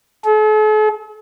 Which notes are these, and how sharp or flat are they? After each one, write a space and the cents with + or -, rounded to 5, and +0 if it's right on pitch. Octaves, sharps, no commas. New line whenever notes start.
A4 -45